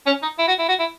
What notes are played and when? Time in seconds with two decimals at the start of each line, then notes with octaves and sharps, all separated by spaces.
0.06 C#4
0.22 D#4
0.39 E4
0.48 F#4
0.59 E4
0.69 F#4
0.80 E4